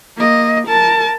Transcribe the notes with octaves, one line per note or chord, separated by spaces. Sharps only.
A#3 D#5
A#4 A5